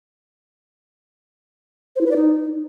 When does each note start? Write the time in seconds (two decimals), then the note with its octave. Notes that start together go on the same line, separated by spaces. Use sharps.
1.96 C5
2.01 E4
2.06 B4
2.11 D5
2.16 D#4